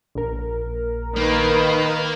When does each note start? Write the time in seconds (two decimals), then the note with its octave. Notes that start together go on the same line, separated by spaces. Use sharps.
0.15 A#1 A#4
1.16 D#3 A#3 B4